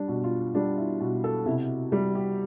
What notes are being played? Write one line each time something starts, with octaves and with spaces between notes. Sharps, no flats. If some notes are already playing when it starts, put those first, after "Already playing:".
Already playing: G3 D4
B2
F4
G3 D4
E4
B2
A4
C3 E4
G3
G4